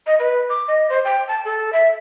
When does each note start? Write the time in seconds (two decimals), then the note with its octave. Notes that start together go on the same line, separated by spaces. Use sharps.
0.07 D#5
0.19 B4
0.50 D6
0.68 D#5
0.90 C5
1.05 G5
1.28 A5
1.45 A4
1.73 E5